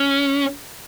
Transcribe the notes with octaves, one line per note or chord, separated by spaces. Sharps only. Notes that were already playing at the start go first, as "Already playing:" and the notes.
Already playing: C#4